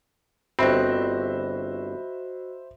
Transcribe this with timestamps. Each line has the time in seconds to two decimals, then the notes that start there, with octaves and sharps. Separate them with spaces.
0.59 G1 C4 F#4 C5 D#5 E5 B5 F#6